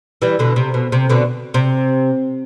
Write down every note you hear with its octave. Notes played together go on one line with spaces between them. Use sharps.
E3 G3
B2 D3
C3
B2
C3
B2 D3
C3